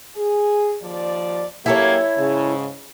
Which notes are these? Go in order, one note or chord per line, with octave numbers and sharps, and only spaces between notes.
G#4
D#2 F3 D5
F#2 A#3 E4 G4 A4 C#5
G#2 C#3